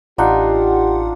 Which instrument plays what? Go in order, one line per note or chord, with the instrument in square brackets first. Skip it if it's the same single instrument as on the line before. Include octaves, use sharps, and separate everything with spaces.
[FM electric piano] A1 F#5 [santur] D4 D#4 F4 [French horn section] G4